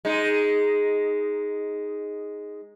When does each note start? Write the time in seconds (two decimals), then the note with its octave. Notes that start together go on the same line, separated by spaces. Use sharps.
0.05 G#3 D#4